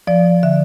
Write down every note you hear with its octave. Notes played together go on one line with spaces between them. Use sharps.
F3 D5
D3 E5